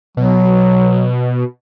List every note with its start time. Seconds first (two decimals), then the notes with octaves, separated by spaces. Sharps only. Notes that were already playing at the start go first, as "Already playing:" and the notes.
0.17 B2 F#3